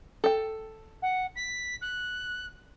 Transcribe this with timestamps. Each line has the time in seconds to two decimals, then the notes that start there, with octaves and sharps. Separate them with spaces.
0.24 A4 G5
1.02 F#5
1.36 B6
1.81 F#6